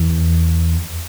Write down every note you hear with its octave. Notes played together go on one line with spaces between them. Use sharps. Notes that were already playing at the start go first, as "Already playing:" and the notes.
Already playing: E2